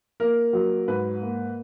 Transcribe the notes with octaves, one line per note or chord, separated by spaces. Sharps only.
A#3 A#4
F#3
G#2 B4
A#3